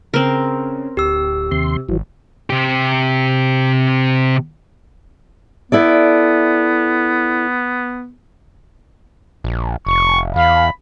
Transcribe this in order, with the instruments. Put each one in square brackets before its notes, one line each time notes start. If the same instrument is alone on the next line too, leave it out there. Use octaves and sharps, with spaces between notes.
[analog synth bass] C#3 [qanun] C4 A#4
[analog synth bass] D1 [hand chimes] G4 E6
[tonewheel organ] D#2 C6 [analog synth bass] C3
[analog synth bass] G#1 [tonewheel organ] E3 F#3
[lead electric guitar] C3 G4
[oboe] B3 [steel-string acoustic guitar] E4 A4 D5
[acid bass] A#1
[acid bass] F1 [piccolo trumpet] C#6
[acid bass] E2 [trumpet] F5 [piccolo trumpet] B5